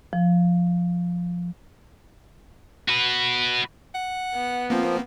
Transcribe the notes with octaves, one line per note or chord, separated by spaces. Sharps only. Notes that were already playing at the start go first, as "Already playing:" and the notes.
F3
F#4 B4
F#5
B3
F3 A#3 C4